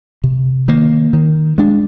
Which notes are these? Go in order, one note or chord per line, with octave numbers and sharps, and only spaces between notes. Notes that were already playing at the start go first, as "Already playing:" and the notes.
C3
D#3 A#3
D#3
G#3 D4